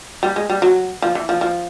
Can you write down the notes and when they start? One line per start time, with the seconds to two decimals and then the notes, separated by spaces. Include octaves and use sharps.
0.23 G3
0.36 G#3
0.50 G3
0.62 F#3
1.02 F3
1.15 E3
1.29 F3
1.41 F3